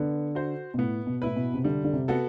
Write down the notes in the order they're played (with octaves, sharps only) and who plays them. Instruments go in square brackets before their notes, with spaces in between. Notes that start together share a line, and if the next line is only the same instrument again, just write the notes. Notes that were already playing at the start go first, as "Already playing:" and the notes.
Already playing: [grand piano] D3 [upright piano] B3
[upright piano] F#4 C5
[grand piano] B2
[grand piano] A2 [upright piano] B3
[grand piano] B2
[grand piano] A2 [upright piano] E4 B4
[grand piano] B2
C3
[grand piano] D3 [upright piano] G3
[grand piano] D3
C3
[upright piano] B3 F#4 A4